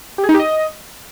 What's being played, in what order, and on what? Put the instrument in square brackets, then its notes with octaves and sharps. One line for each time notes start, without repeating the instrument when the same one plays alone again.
[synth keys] G4
G#4
D#4
G4
D#5